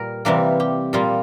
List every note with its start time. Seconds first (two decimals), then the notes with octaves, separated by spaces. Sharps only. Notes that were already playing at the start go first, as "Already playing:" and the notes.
Already playing: A#2 G3 A#4
0.25 C3 E3 G3 A#3 A#4
0.60 G4
0.93 A#2 G3 A#3 F4